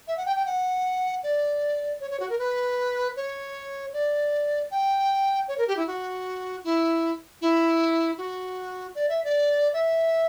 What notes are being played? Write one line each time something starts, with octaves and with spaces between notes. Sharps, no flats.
E5
F#5
G5
G5
F#5
D5
C#5
C#5
F#4
A#4
B4
C#5
D5
G5
C#5
A#4
G4
E4
F#4
E4
E4
F#4
D5
E5
D5
E5